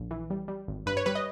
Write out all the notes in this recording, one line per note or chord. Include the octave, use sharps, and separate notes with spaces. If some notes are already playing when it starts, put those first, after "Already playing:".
Already playing: A#1
E3
G3
G3
G#1
G2 B4
C#5
G3 B4
D#5